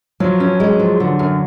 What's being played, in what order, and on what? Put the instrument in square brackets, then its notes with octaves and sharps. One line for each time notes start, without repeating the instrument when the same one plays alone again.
[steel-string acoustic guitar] F3 [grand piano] F#3
[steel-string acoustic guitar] C#4
G#3
F3
D3
F#2